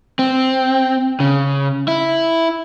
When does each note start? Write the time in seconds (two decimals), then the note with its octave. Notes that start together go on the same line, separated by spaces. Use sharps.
0.19 C4
1.20 C#3
1.88 E4